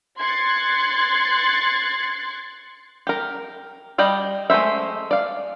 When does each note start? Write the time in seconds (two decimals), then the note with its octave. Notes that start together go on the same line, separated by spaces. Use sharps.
0.17 C6 F#6 G#6 A6 C7 C#7
3.07 G4 A#4
3.98 G3 D5 D#5 G5
4.50 G#3 A3 A#4 C5 E5
5.11 D5 F5